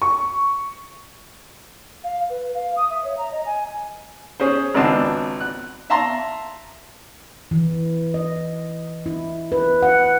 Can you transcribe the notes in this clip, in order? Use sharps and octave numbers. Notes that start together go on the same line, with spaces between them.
C#6
F5
B4
F5
D#6
E5
C#5
A#5
D#5
G#5
C#4 G#4 C5
G#1 C#2 B3 C4 D4 A5
F#6
E5 F5 A5 A#5 C6
E3
D#5
E4
B4
F#5